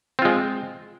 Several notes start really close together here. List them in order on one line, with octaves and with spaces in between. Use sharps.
C4 F4 G#3